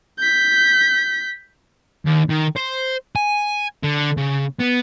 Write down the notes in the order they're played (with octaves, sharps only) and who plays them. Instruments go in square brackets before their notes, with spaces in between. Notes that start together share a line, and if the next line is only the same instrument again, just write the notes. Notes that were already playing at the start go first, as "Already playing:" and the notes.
[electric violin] G6 B6
[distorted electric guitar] D#2
D#3
C5
G#5
D3
C#3
B3